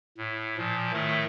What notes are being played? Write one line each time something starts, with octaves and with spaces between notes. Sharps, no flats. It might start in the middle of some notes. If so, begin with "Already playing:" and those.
A2
A#2 F3
A2 D#3 A3